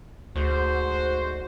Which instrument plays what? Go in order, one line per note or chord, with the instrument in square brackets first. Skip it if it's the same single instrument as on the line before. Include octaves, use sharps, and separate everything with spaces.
[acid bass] D2 [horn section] G#2 F#4 C5